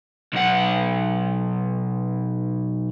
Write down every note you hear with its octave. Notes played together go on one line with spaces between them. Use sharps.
B1 F#5